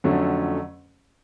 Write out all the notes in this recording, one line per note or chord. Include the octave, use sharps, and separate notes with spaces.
F2 D3 F#3 A3 C#4